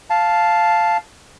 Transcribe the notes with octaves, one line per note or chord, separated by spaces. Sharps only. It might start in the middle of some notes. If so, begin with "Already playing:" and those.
F5 A5